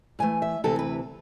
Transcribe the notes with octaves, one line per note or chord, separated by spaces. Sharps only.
A2 E3 A3 G#5
E5
D2 C3 E3 A4
B4